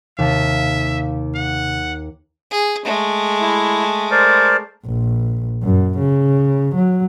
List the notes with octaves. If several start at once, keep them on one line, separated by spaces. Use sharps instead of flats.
D#2 C3 E5 F5 A5
F#5
G#4
G#3 A3
E4
A#4 C5 D5
A#1
F#2
C#3
F#3